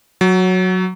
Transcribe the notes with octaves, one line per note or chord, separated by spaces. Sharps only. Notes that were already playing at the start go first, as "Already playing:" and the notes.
F#3